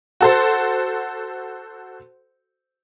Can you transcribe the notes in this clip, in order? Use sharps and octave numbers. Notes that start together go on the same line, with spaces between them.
F#4 A4 C5